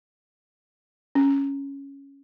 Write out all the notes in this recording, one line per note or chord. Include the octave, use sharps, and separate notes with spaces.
C#4